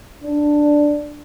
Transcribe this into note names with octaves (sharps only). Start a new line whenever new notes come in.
D4